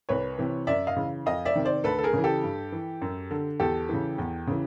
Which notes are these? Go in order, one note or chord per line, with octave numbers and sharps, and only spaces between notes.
C2 B4 C#5
C3 E3
F#2 D5 E5
D#5 F5
C#3 E3
F2 D#5 F5
D5 E5
C3 D#3
C5 D5
D2 A4 B4
A4
G#4 A#4
C#3 E3
G4 A4
G2
E3
F#2
D3
E2 G4 A4
C#3 E3
E2
C#3 E3